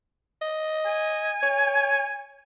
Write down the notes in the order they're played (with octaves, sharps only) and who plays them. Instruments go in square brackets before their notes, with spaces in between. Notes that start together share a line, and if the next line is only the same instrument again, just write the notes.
[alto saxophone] D#5
[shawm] G#5
[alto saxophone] C#5